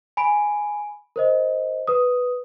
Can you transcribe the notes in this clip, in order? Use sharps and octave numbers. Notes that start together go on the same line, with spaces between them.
G#5 B5 D7
A#4 C5 D#5
B4 D#6